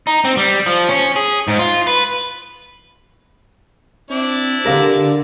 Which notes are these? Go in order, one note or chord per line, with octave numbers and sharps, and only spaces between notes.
D#4
C4
G3
F3
C#4
G#4
G#2
F4
B4
C4 D4 E4 D5
D3 G4 A#4 F5